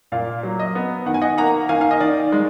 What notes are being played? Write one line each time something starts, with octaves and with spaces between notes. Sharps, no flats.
A#2 D5 F5
F#3
D#5
B3
D#3 F#5
G#5
D#5 F#5
A#3 F#5 A#5
D#3 F5 G#5
F5
D#5
D#3 D5
G#3